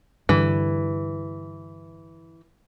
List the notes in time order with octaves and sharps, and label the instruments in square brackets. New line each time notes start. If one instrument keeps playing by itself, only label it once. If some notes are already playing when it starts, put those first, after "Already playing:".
[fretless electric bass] G2 D3 [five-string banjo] E3